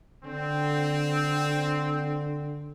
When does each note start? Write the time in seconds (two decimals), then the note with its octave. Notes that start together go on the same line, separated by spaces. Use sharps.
0.25 D3 C4